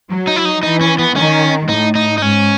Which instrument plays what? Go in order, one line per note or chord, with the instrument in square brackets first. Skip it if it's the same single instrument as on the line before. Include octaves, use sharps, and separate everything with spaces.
[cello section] F#3
[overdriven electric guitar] D#4
E4
D#4
[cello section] E3 [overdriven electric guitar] D#4
[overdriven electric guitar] C#4
B3
[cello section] D#3 [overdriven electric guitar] C#4
[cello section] A2 [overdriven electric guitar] D#4
[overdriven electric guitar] D#4
D#4
[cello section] G#2 [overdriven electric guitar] C#4